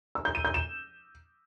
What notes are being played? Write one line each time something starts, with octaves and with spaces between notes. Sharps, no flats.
E6
G6
D#7
G6
E7